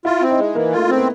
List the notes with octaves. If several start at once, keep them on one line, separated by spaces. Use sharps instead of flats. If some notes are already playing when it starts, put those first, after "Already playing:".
E4 F4
C4
D#4
G#3
E3 A#3
A3 F4
A#3
C4
B3